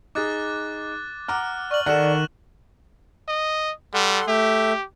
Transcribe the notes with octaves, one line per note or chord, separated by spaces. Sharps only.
D#4 G#4 D6 F#6 A6
F#5 A#5 D6 F6 F#6
D5 C#6 F6 F#7
D#3 A4 D5 F#5 F#6 E7
D#5
G3 A4 F#5 C6
A3 G4 E5